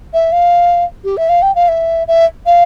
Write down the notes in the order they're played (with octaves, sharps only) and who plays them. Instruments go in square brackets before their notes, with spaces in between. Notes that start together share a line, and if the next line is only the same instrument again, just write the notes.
[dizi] E5
F5
G4
E5
F5
G5
F5
E5
E5
F5